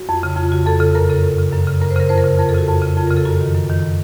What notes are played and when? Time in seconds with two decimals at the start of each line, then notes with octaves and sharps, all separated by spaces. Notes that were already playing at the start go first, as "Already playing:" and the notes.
Already playing: F#4
0.09 F2
0.23 C#3
0.37 F2 F4
0.52 C#3 F#4
0.66 F2 A4
0.80 C#3 A4
0.95 F#2 A#4
1.09 C#3 A4
1.24 F#2
1.39 C#3
1.53 F#2
1.67 C#3
1.81 F#2 A#4
1.91 C5
1.96 C#3 A#4
2.09 F2 C5
2.18 A#4
2.24 C#3
2.39 F2 A#4
2.49 A4
2.54 C#3 F#4
2.68 F2
2.82 C#3
2.97 F2 F4
3.07 A#4
3.11 C#3
3.17 A4
3.25 F#2 F#4
3.41 D#3
3.54 F#2
3.70 D#3